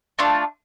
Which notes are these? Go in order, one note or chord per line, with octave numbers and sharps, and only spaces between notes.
A3 D4 F4